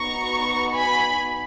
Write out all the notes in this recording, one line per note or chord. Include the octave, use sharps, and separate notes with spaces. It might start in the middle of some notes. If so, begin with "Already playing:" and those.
Already playing: B3 D#4 F#4 A#5 C#6
G#5 B5